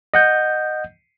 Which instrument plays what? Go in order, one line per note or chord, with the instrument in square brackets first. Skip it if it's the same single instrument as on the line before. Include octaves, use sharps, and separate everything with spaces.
[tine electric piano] D#5 F#5 G6